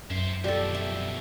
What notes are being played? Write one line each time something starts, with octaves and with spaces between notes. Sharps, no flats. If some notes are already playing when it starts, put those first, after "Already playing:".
F#2 C5 E5
B2 F3 G4 A4 D5
E5